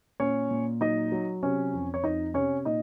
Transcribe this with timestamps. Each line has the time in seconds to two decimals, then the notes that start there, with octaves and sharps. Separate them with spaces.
0.20 A#2 C#4 C#5
0.51 A#2
0.81 F#3 D#4 D#5
1.12 F#3
1.43 C3 C#4 C#5
1.74 F2
1.94 C#5
2.04 F2 D#4 D#5
2.34 C3 C#4 C#5
2.65 A#2 D#4 D#5